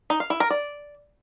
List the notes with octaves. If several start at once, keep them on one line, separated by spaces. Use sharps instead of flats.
D#4
F5
E4
A#4
D5